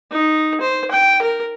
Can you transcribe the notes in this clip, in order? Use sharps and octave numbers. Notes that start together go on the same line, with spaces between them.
D#4
C5
G5
A#4